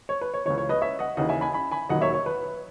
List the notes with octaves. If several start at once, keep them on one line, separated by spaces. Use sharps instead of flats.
C#5
B4
C#5
C#2 C#3 E3 C#5
C#5
B4 D#5
C#5 E5
D#5 F#5
D#2 C#3 E3 D#5 F#5
E5 G#5
G#5 B5
G#5 B5
G#5 B5
E1 D#2 D#3 F#3 D#5 F#5
C#5 E5
C#5
B4